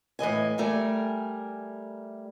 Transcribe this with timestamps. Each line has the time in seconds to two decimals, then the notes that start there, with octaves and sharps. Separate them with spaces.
0.19 A2 E3 D#5 G#5
0.58 G3 A3 A#4 G#5